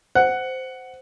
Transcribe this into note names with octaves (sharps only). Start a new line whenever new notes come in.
C5 F#5